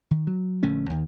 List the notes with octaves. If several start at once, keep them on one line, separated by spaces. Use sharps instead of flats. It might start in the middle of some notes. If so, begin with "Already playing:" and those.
D#3
F#3
A#1 D3 A3 C#4
D#2 D#3